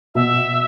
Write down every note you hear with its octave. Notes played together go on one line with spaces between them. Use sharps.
B2 E5